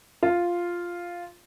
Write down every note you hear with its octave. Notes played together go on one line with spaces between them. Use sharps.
F4